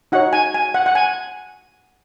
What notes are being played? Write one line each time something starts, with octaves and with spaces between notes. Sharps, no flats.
D#4 F#4 C#5 F#5
G#5
G#5
F#5
F#5
G#5